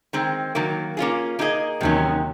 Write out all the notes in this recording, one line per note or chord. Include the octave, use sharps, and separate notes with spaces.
D#3 G#3 C4
D#3 F#3 A#3
A#3 C#4 F4 G#4
A#3 D#4 G#4 D#5
D#2 C3 D#3 F#3 C#4